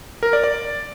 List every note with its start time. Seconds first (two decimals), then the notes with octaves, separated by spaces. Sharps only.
0.23 A#4
0.33 D5
0.44 D5